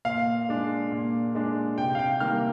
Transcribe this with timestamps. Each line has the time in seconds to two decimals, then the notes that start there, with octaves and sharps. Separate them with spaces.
0.05 A#2 F5
0.49 G#3 D4
0.92 A#2
1.35 G#3 D4
1.78 C3 G5
1.95 F5
1.99 G5
2.20 D#3 G3 A#3 F6